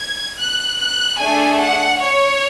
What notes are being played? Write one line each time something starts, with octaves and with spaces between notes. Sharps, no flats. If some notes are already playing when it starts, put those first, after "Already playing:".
Already playing: G#6
F#6
F#6
A3 D4 G#4 G#5
F#5
C#5